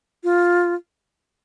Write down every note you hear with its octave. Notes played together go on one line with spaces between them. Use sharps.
F4